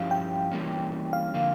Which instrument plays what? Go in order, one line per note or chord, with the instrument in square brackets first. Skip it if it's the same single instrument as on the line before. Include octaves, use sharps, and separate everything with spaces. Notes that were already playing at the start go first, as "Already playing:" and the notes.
Already playing: [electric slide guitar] G2 F3 C#4 E4 G4 [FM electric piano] F5
[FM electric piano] G5
[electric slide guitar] E3 G3 A#3 C#4
[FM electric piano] F5
[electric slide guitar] D3 F3 A#3